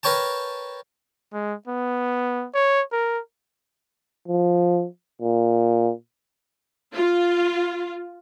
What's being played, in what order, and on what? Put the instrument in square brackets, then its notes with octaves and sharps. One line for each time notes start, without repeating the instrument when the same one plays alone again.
[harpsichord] A#4 B4 C#5 G5 A5
[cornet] G#3
B3
C#5
A#4
[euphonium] F3
A#2
[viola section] F4